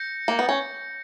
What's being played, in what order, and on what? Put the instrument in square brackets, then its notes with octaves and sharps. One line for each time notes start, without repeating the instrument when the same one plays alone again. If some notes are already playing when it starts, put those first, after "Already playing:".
Already playing: [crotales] G6 A#6 C#7
[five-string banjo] A#3
B3
C#4